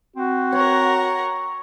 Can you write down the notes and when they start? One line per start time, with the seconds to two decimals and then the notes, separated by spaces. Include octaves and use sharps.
0.16 C4 F#4
0.52 A#4 C#5 F#5